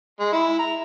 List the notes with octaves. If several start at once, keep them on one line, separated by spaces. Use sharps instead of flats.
G#3
E4
A#5